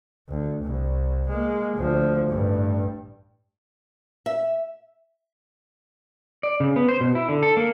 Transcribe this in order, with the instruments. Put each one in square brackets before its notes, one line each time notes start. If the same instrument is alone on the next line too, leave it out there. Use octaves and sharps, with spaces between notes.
[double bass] D2
C2
G#3 A#3
D2 F3
A1 G2
[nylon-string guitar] E5
[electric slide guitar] D5
C#3
B3
C5
B2
E4
D3
A4
A#3